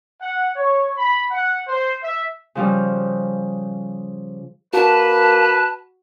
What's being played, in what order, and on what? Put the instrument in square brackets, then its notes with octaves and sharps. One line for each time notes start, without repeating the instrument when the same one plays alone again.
[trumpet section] F#5
C#5
B5
F#5
C5
E5
[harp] C#3 F3 G3
[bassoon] A#3 [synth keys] F#4 [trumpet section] B4 [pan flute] A5